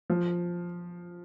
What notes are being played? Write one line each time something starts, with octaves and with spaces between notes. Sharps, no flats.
F3